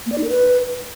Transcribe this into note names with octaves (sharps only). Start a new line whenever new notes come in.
A#3
D5
D#4
A#4
B4